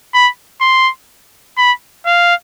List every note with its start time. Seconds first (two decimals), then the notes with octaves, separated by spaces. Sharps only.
0.14 B5
0.61 C6
1.58 B5
2.06 F5